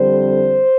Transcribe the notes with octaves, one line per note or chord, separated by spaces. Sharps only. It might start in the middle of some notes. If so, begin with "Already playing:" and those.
Already playing: F2 D3 G3 C4 C5